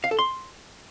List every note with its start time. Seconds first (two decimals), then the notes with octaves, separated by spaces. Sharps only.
0.04 F5
0.11 A4
0.19 C6